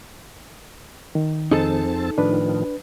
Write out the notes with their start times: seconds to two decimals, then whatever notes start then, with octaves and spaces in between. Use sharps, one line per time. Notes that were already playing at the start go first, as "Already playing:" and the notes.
1.15 D#3
1.51 F2 C4 D#4 G#4 A4 A5
2.18 A2 D#3 F3 D4 B4